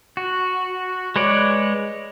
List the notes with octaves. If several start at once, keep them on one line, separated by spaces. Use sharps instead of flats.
F#4
G#3 B4 C#5 D5